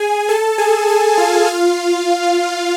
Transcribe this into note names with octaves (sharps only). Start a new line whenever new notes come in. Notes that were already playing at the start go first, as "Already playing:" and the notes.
Already playing: G#4 G#5
A4 A5
G#4 G#5
G#4 G#5
F4 F5
F4 F5